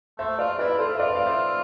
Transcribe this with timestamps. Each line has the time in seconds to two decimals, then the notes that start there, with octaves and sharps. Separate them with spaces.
0.18 A3 C5 E5
0.39 F4 D5 F5
0.58 E4 B4 D5
0.79 F4 A4 C5
0.95 E5
0.99 F4 B4 D5
1.16 F5
1.26 C5 E5